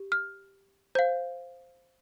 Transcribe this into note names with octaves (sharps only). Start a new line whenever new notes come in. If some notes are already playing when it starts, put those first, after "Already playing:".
Already playing: G4
F6
C5 F5 G6